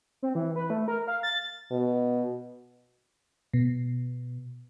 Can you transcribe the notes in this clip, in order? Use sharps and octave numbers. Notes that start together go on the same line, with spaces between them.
C4
E3
B4
A3
A#4
F5
A6
B2
B2